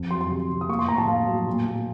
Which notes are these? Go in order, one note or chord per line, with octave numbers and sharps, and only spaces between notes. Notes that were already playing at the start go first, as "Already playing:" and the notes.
Already playing: F2
F#3 C6
C6
C3
C3
D#6
A#3 C#6
C6
A2 A#5
A5
A#3 F5
F#3
A#2
A#2